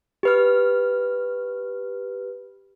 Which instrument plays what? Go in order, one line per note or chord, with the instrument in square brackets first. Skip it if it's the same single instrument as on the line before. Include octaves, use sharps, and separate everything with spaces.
[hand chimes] G4 B4 F6